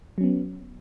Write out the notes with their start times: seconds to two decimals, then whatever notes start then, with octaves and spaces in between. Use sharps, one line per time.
0.18 F#3
0.21 C#4
0.24 B3